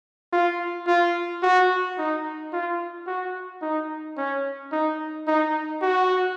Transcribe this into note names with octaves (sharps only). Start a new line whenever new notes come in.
F4
F4
F#4
D#4
F4
F#4
D#4
C#4
D#4
D#4
F#4